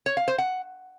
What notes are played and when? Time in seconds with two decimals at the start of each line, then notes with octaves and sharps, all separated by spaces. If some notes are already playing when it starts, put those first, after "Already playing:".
0.06 C#5
0.17 F5
0.28 C5
0.38 F#5